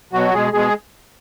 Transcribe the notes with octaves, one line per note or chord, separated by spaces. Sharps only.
B2 F#3 F#4
B2 G#3 G#4
B2 G#3 G#4